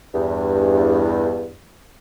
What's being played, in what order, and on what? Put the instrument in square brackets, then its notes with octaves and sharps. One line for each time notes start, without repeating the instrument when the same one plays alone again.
[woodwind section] E2 G2